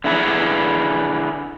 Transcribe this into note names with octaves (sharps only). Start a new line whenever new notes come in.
D3 E4 G#4 B4